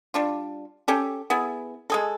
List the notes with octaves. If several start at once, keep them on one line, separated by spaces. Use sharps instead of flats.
G3 D4 F4
C#4 G4 A4
B3 E4 G#4
G#3 G#4 A4